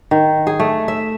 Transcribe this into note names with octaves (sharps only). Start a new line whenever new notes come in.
D#3
G#4
A3
E5